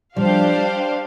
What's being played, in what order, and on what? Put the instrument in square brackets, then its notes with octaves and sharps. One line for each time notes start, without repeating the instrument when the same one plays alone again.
[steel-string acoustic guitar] F3 G3 [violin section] D4 G4 C5 F5